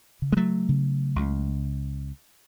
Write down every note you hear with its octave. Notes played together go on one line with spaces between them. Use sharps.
C#3
G#3
F#3 A3
C#3
C#2